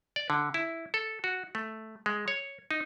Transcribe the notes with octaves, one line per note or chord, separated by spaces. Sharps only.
D5
D3
E4
A4
F#4
A3
G#3
C#5
D#4